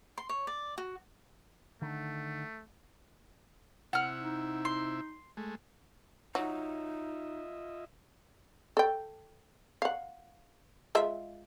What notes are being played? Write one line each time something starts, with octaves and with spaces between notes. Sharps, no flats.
C6
C#5
D5
F#4
D3 D#3 A3
C3 E4 F#5 F6
D#4
C6
G#3 A3
F#3 D#4 F4 D#5 E5
A4 G5
F5 F#5
G#3 F4 E5